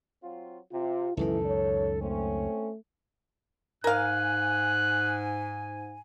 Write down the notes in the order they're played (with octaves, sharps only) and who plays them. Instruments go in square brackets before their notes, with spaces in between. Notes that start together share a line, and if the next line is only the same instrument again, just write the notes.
[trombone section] F#3 C4 F4
[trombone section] C3 [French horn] F4
[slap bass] C#2 F#2 D#3 [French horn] E3 [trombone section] A4
[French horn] C#5
[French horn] A3 [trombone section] C4 C#4
[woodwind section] G#2 G#5 [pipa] A#4 F5 [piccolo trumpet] F#6